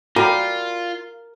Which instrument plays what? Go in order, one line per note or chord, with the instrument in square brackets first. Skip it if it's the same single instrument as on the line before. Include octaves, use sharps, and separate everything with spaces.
[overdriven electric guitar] F4 [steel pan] F#4 G5 [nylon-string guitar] A#4 [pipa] D5 G#5 B5